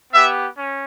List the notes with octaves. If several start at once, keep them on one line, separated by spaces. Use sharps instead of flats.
B3 G4 E5
C#4